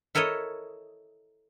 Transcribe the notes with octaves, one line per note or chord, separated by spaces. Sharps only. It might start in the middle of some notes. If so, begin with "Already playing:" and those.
E4 A4 A#4 C#5 D#5